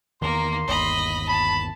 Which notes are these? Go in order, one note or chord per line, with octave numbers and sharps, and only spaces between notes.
E2 D#3 A#3 A#4 C6
G1 D#2 D#5 B5
A5 B5